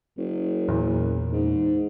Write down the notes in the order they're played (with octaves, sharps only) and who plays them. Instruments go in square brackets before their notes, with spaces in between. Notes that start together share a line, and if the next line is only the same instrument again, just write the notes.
[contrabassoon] F#1
[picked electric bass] E2 A#2
[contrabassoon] G#2